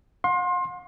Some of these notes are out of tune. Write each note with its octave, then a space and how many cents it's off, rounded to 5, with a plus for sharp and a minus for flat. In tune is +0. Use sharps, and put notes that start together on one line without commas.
F#5 -45 C6 +25